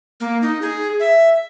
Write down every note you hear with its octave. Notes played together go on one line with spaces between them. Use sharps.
A#3
D#4
G#4
E5